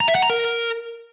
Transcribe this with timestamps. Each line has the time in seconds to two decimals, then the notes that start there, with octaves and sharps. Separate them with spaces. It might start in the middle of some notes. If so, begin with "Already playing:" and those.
0.01 A#5
0.08 E5
0.15 F#5
0.22 A#5
0.30 A#4